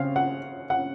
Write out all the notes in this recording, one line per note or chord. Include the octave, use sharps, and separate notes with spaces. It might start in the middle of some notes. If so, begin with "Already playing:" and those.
Already playing: C#3 C4 F5
F#5
F#5